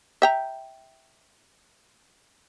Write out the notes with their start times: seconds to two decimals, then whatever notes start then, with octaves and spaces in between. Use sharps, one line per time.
0.22 E5 G5 A#5